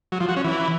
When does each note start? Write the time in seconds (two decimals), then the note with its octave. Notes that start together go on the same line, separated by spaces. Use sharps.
0.12 F#3
0.20 F3
0.28 F#4
0.36 C#4
0.45 E3